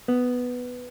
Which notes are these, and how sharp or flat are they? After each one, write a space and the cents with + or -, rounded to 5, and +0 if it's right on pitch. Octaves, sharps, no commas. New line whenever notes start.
B3 +5